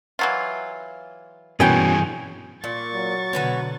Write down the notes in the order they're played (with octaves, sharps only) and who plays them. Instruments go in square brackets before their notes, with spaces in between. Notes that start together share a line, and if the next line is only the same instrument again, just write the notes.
[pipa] E3 F#3 F4
[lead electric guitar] G2 E3 [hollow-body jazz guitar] B2 C#4 G5 [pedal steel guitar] G#4 G#5 G6
[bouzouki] A#2 [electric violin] C#6 A6
[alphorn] F#3
[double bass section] B2 D3 [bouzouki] F#4 B4 C#5